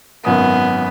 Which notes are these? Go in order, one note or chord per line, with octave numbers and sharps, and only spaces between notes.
G#1 F#2 B3 D#6